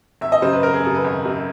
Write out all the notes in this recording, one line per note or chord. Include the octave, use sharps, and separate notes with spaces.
G#1 E5
D#5
F#2 C#3 C5
B4
G#1 A#4
G#4
F#2 C#3 A4
B4
G#1
F#2 C#3